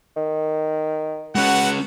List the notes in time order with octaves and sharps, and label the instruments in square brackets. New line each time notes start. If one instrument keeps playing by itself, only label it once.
[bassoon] D#3
[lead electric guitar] G#3 C#4 [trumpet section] F#4 B4 F#5